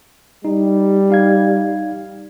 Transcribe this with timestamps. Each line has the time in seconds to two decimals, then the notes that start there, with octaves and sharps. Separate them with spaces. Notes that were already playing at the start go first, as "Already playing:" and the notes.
0.45 G3 D#4
1.10 D#4 F5 G#6